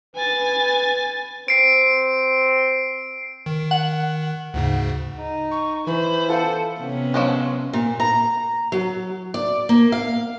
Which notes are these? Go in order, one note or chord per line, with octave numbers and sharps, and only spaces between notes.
B4 G#5 A6
C4 C7 D7
D#3
F#5
D2 G#2 C#3
D#4
C#6
E3 C5 B5
F4 A4 F#5
C3 B3 C#4
F3 F#3 G#3
A#2
A#5
F#3
D5
A#3
F5